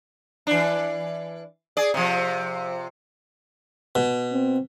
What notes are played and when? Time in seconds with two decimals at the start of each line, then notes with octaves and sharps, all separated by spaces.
0.47 E3 D4
1.77 G#4 D5
1.94 C3 F3
3.95 B2
4.32 C4